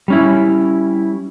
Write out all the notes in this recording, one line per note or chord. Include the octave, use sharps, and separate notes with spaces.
G3 C#4 E4